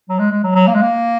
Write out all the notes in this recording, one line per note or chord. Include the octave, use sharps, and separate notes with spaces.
F#3
G#3
G#3
F#3
F#3
A#3
G#3
A#3